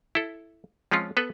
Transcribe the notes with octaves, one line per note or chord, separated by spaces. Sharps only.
E4 A4
F3 G#3 C4 C#4 F4
B3 A4 B4